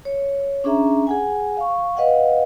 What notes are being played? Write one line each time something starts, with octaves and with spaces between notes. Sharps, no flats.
C#5
C#4 D4 G#4 E5 A#5
G#4 F#5 G#5
F5 C#6
B4 D#5 F5 F#5